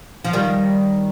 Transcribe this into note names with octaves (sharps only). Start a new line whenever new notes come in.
F3
D#3 G3